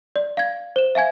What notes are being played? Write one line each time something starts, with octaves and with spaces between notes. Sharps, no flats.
D5
F5 G#6
C5 E7
E5 F5 G#5 G#6